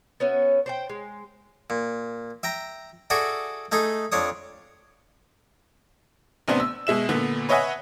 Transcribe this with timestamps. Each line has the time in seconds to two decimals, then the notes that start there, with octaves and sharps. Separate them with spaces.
0.20 B3 C#4 F#4 E5
0.66 C5 D5 G5
0.89 G#3
1.70 A#2
2.43 E5 G5 A#5
3.10 F#4 G#4 A4 D5 E5
3.72 A3 D#4 G#4 A4
4.12 F2 D4 C#5 D#6
6.48 A1 C3 B3 D4 C5
6.60 E6
6.87 B2 G#3 E5 E7
7.09 A#2 D3 B3
7.49 B4 C#5 D#5 E5 F#5 G#5